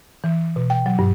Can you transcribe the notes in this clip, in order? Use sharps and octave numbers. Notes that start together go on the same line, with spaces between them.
E3
B2
G5
F#3
G2